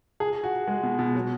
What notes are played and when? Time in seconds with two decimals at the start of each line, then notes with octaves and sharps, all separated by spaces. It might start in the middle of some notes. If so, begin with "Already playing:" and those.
0.20 G#4
0.44 F#4
0.67 G#3
0.83 B2
0.99 B2
1.15 F#3